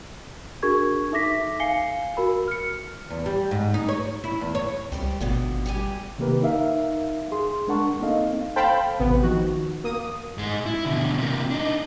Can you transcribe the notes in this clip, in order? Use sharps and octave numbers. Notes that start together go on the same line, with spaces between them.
D4 F#4 G#4 A#4 C#6 G#6
D#4 A4 E5 D6 A#6 B6
F5 G#5 C7 C#7 G7
F#4 A#4 B5
F6 C#7
E2
G3
G#2
D#4
C#5
E4
E2
C#5
C#2 G3 C5 D5
G#1 F2 B2 D3
G3 G4 G#5
C3 D#3 A#3 G4 A#4 B4
D#4 A#4 E5 F5
G#4 C6
G#3 D4 A#4 F#5 A5 C#6
A#3 C4 D#4 A4 D#5 F5
A4 C5 F5 G5 A5 B5
A1 C3 B3 B4
D#3 F3 F#4
A#3 D#6 D#7
G#2 G#3
E4
B2 D3
C3 A#3
D4 D#4